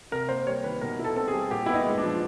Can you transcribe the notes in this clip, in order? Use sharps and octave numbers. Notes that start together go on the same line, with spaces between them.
C3 A#4
A#3 C5
G3 C#5
D#3 B4
B2 A#4
E4
A4
C4 A4
G#4
G3
A#2 G4
B3 E4
D#4
G#3
D4
F3